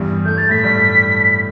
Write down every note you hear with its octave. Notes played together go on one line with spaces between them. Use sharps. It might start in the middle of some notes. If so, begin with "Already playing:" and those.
Already playing: E2 G2 E3 G3
A3 G6
A6
A2 A3 B6
G2 G3